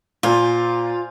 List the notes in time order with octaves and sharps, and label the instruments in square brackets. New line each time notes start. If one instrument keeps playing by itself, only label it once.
[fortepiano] A#2 [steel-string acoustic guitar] F4 [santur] C5 F5 G#5